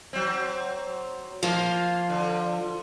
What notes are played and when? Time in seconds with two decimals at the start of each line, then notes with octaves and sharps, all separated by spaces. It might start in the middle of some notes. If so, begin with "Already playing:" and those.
0.13 F#3 C4
1.43 F3 A#3 F4
2.10 D3